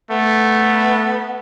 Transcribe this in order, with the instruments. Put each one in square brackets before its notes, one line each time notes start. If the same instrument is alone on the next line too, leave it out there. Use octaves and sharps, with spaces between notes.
[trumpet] A3 [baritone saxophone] B3